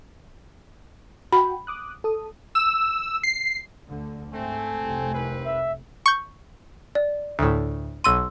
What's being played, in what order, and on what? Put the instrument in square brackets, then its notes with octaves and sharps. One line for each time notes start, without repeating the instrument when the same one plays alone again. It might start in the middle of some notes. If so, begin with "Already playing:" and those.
[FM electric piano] F#4 G5 [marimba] B5
[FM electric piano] D6 D#6 F#6
A4 D#6
[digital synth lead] E6
C7
[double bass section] D2 D3
[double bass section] G#2 [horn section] A3 C4 [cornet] G#5
[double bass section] F1 C2
[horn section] D#3 C4 B4
[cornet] E5
[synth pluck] C#6 G6
[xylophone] D5
[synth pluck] D2 A2
[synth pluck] B1 D#7 [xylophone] C6 E6